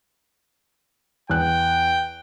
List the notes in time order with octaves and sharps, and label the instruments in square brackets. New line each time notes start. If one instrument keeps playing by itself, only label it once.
[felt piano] E2 F#6 [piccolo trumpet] G5